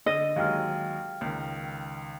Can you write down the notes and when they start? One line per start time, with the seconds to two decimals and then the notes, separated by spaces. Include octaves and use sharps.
0.06 D3 D#5
0.36 D#2 F#3 G#3 F5 G5 F6
1.21 C#2 D#3